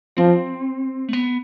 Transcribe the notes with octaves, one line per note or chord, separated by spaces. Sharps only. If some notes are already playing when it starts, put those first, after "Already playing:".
F3 C4
A3
B3